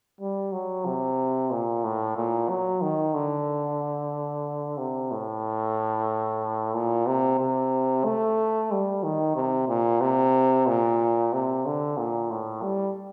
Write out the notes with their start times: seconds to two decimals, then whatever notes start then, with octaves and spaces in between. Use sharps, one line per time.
0.21 G3
0.52 F#3
0.86 C3
1.51 A#2
1.84 A2
2.16 A#2
2.49 F#3
2.82 D#3
3.14 D3
4.78 C3
5.12 A2
6.74 A#2
7.07 C3
7.40 C3
8.05 A3
8.71 G3
9.04 D#3
9.36 C3
9.68 A#2
10.01 C3
10.67 A#2
11.33 C3
11.66 D3
11.98 A#2
12.31 A2
12.63 G3